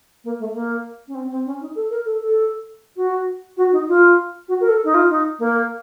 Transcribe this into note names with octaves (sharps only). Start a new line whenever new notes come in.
A#3
A3
A#3
C#4
C4
C4
C#4
D#4
A4
A#4
A4
A4
F#4
F#4
D#4
F4
F#4
A#4
A4
D#4
F4
D#4
A#3